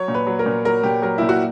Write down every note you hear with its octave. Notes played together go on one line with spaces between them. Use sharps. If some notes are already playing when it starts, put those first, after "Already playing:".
Already playing: F#3 C#5
A#2
B4
F#3
A#4
A#2
F#3 A#4
A#2 G4
F#3 A#4
A#2 E4
F#4